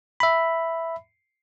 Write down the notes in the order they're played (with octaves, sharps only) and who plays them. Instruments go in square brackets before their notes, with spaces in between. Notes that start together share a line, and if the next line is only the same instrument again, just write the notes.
[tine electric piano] E5 B5